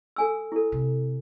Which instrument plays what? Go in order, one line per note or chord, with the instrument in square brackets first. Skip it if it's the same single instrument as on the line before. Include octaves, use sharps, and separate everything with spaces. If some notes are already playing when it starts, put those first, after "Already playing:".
[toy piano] A4 G#5 E6
E4 A4
[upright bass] C3